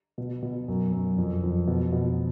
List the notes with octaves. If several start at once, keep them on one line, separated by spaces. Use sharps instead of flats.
B2
B2
F#2
F#2
F2
F2
B2
B2